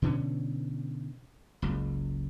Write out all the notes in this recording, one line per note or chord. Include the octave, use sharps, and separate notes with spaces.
B2 D3 E3 C#4
F#1 C#2